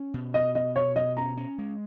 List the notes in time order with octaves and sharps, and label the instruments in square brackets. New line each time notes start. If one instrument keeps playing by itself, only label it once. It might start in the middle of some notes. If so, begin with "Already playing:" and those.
Already playing: [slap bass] C#4
B2
[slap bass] B2 [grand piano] D#5
[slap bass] B2 [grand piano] D#5
[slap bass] B2 [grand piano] C#5
[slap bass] B2 [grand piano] D#5
[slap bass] C#4 [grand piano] A#5
[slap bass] C#4
G#3